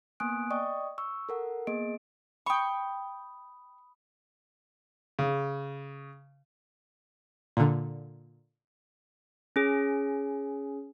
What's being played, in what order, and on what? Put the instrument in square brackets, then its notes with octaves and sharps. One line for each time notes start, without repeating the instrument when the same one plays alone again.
[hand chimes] A#3 B3 G#5 D#6 F#6 D7
D5 D#5 G5 C#6 D#6
C#6 E6
A4 A#4 F#5
A#3 B3 G#4 D#5 D7
[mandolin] G5 C#6 [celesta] B5 D#6
[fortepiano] C#3
[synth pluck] A#2 D3
[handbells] C#4 G#4